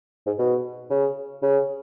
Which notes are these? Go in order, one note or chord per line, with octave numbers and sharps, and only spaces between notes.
G#2
B2
C#3
C#3